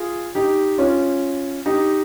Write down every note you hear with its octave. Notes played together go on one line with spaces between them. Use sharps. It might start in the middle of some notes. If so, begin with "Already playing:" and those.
Already playing: F4 G#4
D#4 G4
C#4 F4
D#4 G4